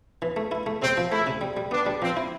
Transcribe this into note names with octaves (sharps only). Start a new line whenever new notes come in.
E3
A3
E4
A3
C3 C4
F3
A3 E4
C3
G3
G3
B3 D4
G3
F3 C4
E4